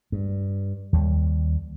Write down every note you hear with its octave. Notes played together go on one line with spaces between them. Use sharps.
G2
D#2 G3